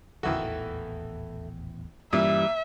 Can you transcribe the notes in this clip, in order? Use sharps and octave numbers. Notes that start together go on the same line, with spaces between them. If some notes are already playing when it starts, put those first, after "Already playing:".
D#1 A1 E2 D#3 E3 F#4 A4 E5
G2 A#2 E3 G3 C#4 E5